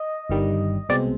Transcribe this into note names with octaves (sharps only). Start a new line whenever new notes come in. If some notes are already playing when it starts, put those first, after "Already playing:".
Already playing: D#5
G1 G2 D#3 G3
C2 B2 G#3 C4 D5